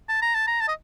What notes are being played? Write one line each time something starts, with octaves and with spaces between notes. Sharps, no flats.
A5
A#5
A5
A#5
A5
D#5